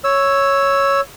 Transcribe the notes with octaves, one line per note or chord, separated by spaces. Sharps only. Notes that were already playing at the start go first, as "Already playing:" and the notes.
C#5 E6